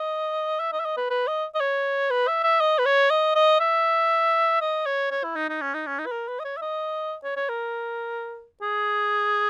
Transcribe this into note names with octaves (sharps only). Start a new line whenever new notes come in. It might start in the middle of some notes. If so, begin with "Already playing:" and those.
Already playing: D#5
E5
D#5
E5
D#5
B4
B4
D#5
D#5
C#5
B4
E5
E5
D#5
B4
C#5
D#5
D#5
E5
D#5
C#5
C#5
E4
D#4
D#4
C#4
D#4
C#4
D#4
B4
A#4
B4
D#5
C#5
E5
D#5
C#5
C#5
A#4
G#4